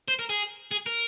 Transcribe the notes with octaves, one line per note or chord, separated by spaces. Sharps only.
C5
A#4
G#4
G#4
A#4